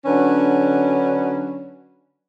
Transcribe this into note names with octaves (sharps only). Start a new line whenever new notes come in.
D3 F#3 C#4 D4 B4